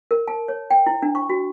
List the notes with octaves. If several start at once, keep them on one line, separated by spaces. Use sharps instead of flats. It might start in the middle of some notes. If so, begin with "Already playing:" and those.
A#4
A5
C#5
G5
E4
D4
C#6
F#4